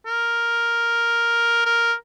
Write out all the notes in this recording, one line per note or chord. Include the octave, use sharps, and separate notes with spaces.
A#4
A#4